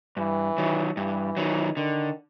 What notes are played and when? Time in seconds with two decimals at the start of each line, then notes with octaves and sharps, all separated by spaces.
0.17 G2 E3
0.58 D#3 F#3
0.97 G2 E3
1.37 D#3 F#3
1.76 D3 D#3